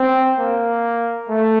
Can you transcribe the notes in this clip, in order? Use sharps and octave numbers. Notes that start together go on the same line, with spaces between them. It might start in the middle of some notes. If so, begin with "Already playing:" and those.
Already playing: C4
A#3
A3